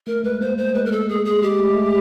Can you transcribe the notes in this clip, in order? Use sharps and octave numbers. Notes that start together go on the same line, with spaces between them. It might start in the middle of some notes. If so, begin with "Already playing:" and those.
A3 A#4
G#3 B4
A#3 C5
A3 C5
G#3 B4
A#4
A4
G#4
G#4
G#3 G4
A3
G#3
A3